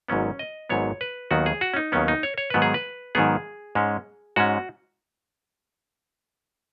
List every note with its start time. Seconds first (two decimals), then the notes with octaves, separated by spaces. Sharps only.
0.08 G#1 G#2 F#3 B3 C#4
0.39 D#5
0.69 G#1 G#2 F#3 B3 C#5
1.01 B4
1.31 D#2 D#3 F#3 B3 F#4
1.46 G#4
1.61 F#4
1.74 C#4
1.76 D#4
1.92 D#2 D#3 F#3 B3 C#4
2.08 D#4
2.23 C#5
2.38 C#5
2.50 G#2 D#3 F#3 B3 B4
2.62 G#4
2.74 B4
3.15 G#2 D#3 F#3 B3 G#4
3.75 G#2 G#3 C#4
4.36 G#2 G#3 C#4 F#4